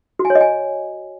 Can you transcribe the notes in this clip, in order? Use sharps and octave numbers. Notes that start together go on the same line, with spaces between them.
F#4
G#5
C#5
D#5
G#5